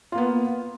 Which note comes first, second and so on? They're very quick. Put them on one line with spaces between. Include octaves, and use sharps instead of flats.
F4 A#3 B3